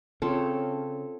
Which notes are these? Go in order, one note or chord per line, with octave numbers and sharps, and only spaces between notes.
C#3 C4 F4 A4 C#5